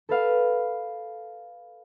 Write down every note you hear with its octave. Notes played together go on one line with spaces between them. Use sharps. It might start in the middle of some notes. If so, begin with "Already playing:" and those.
A4 B4 F5